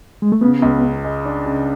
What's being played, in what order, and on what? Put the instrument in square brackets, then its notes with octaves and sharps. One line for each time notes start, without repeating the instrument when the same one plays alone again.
[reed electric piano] G#3
A3
[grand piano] C#3 [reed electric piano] B3
[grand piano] C#2
C#3
G#3
D4
C#3